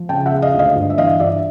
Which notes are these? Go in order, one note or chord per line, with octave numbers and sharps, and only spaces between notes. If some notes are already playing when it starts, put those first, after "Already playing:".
Already playing: F3
C#3 G5 A5
E5 F#5
G#3
D#5 F5
D2
D#5 F5
G2
E5
E3 D#5 F5
G2 D5 E5